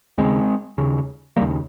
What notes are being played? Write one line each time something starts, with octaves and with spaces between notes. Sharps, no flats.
D#2 C#3 G#3 C4
D#2 C#3
D#2 C#3 G3 A#3